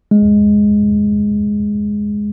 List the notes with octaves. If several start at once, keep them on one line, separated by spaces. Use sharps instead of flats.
G#3